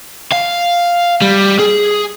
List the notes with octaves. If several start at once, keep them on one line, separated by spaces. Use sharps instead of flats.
F5
G3
G#4